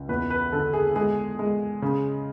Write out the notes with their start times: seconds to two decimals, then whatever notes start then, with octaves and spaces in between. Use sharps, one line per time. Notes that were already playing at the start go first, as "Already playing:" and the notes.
Already playing: C#2
0.09 E2 B4
0.30 B4
0.52 D3 A4
0.73 G#4
0.95 G#3 G#4
1.39 G#3
1.82 C#3